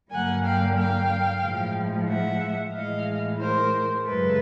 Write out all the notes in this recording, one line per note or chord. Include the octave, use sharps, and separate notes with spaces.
G2 D3 F#3 A#3 F#5 G#5
F5 G5
F5 G5
A2 F3 G#3
E5 F#5
A2 E3 G#3 D#5 F5
A#4 C5
F#2 C#3 E3 G#3 A4 B4